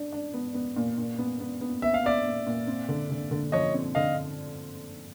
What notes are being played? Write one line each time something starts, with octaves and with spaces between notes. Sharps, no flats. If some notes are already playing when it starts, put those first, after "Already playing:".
Already playing: D4
D4
B3
B3
A#2
A#2
B3
B3
B3
B3 E5
F5
B3 D5 E5
A#2
A#2
C4
D3
D3
D3
F3 C#5 D#5
C4
D3 D#5 F5